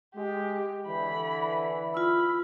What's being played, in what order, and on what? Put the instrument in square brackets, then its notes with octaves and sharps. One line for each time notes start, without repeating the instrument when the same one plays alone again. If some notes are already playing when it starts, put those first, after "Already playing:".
[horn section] G#3 [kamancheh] G4
[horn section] D3 E3 [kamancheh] B5
[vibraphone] F4 E6 [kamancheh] B5